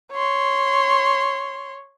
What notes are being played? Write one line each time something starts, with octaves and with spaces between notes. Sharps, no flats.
C#5 C6